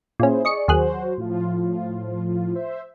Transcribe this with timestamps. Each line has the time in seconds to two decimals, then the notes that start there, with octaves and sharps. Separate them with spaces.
0.20 A#2 C#4 E4 G#4 C5
0.45 G#4 D5 D#5 C#6 C#7
0.68 D#2 F#3 F#4 G#4 C5 F#6
1.18 A2 F3 F4
2.55 C5 E5